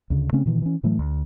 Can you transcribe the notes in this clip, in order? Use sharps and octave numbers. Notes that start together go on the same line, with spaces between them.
D2 C#3
C#3 A3 C4 C#4
A#2 D#3 E3
E3 C#4
A2 E3 F#3 A3
D2